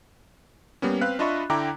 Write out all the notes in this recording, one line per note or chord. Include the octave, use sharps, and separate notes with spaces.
G3 A#3 B3 C#4
C4 B4 F5 F#6
D4 F4 D#5 E5 B5 C#6
D3 E4 G5 A#5 D6